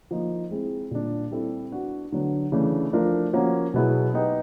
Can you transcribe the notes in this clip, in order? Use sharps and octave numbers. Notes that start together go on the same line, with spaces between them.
F3 A#3 D#4
G#3 C4 E4 G#4
A#2 G3 A#3 D4
G3 C4 E4 A4
B3 D4 F#4
D3 F#3 B3
C#3 E3 A3 D4
F3 A3 D4 F4 A#4
F3 A#3 C#4 F#4
B2 F#3 B3 E4 G#4
B3 D#4 G4 B4